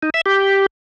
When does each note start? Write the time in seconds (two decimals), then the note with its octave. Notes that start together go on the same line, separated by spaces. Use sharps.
0.03 D#4
0.14 E5
0.26 G4